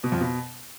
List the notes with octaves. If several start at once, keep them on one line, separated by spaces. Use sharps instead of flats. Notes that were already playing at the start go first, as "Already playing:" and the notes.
B2
F2
B2